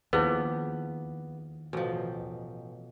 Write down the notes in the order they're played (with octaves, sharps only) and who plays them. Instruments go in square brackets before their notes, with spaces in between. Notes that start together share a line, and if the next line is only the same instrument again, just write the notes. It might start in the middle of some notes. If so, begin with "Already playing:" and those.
[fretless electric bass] D#2 [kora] F3 D4 G4 [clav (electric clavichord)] B3 [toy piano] E4 G#4 B4
[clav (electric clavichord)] A1 [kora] B2 F3